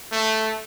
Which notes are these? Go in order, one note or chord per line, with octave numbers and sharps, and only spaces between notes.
A3